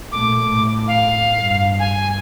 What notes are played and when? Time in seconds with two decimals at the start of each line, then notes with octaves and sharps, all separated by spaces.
0.12 A#2 A3 D6
0.51 A2
0.87 F5
1.38 G2
1.79 G#5